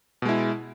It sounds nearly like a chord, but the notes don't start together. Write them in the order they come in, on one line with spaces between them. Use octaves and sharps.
B2 G#3 E4